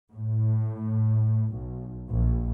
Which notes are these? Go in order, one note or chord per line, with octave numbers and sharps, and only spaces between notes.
A2
B1
A#1